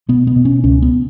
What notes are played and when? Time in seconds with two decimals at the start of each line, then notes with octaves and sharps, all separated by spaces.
0.09 B2 B3
0.27 B3
0.36 B2
0.45 C#4
0.64 C#2 C#4
0.82 B3